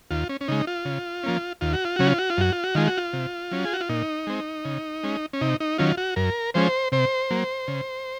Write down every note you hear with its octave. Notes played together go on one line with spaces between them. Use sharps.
D#2 F4
C#4
C#4
C#3 G#3 D#4
F4
C#3
F3 A#3 C#4
D#2 F4
F#4
F4
C#3 F#3 C#4 F#4
F4
F#4
F4
F#2 F#4
F4
F#4
D#3 G#3 F4
F#4
F4
C3
F#3 C#4
G#4
F#4
F4
A#2 D#4
G#3 C4
C#3
G#3 C#4
C#4
C3 D#4
D#4
D#3 F#3 C#4 F4
F#4
F#2 A#4
F3 G#3 C#4 C5
C3 C5
F#3 A#3
C#3